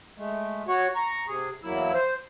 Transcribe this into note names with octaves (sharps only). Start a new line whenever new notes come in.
G#3 A3
F#4 C#5
A#5 C#6
C3 G#4
E2 F#3 A#3 E4 E6
C5